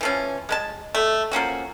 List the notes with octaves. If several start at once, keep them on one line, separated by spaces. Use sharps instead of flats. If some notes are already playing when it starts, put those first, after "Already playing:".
E3 F3 C#4
G#3 B4 A5
A3
F3 A#3 C#4 F#4